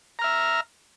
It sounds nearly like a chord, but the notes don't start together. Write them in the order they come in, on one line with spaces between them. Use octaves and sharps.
A#5 F6 E5